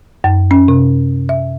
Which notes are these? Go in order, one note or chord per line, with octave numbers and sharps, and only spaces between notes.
F#2
C#4
C3
E5